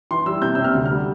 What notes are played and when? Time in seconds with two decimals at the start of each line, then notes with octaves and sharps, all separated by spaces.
0.11 E3 C6
0.26 G3 E6
0.42 C3 G6
0.55 C3 E6
0.64 F6
0.75 D2
0.86 G3 F6